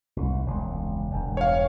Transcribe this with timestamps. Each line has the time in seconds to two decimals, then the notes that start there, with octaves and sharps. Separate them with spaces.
0.16 C2
0.46 E1 C#2
1.11 E1 G2
1.37 C#5 F5